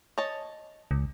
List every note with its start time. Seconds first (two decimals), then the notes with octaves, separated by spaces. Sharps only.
0.18 C#5 D#5 A5
0.91 C#2